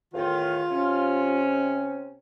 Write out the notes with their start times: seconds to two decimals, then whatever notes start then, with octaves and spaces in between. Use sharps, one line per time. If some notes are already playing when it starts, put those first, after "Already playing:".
0.14 E2 A2 D#3 F4
0.70 C3 C#4